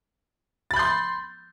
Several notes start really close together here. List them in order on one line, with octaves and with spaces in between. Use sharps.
A6 B5 G6 C6